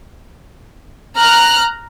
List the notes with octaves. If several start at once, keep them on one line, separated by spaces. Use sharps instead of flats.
A#5 F6 F#6